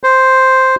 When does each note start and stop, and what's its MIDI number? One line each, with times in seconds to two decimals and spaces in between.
0.04 0.76 72